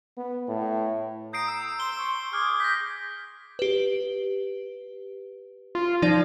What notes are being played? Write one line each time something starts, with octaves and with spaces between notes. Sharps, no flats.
B3
A2
A#5 D#6 G6 C7 D7
E6
C6 G7
C#6
G#4 D6 F6
G6 A#6 B6
G4 B4
F4
F3 D#4 D5